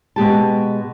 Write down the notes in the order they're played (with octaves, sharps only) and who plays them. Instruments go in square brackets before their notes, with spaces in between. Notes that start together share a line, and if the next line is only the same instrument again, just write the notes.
[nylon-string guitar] B2 G#3 G4 A5